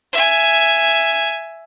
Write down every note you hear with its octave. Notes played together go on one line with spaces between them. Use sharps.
E5 G#5